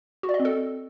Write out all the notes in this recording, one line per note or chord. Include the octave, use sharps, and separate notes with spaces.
F#4
D5
D#5
C4
A4